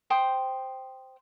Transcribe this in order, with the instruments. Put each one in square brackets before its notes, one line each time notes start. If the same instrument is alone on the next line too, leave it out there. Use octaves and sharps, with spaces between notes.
[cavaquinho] C5 G5 D#6